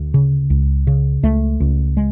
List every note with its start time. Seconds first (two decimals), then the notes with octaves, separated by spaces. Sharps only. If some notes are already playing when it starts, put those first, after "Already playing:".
Already playing: D2
0.14 C#3
0.50 C#2
0.87 C#3
1.23 C#2 A3
1.60 C#2
1.97 G#3